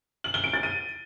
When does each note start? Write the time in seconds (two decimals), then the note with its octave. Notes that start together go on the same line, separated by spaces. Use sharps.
0.24 F#7
0.34 G7
0.44 D7
0.53 A6
0.63 D#7